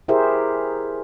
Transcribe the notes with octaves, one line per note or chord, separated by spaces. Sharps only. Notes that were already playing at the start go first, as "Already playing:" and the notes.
E4 G4 G#4 A#4 C5 E5